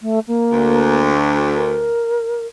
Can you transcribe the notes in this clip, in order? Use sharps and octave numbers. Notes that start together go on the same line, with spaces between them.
A3
A#3
D2
A#4